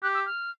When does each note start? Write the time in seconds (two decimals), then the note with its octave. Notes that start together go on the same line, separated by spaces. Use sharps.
0.03 G4 F#6
0.15 E6
0.26 F6